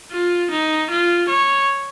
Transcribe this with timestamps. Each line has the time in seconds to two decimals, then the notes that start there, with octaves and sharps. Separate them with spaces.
0.11 F4
0.51 D#4
0.90 F4
1.29 C#5